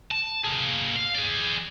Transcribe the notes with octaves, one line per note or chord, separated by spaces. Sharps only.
A5
A#3 G#4
F5
G#4 D5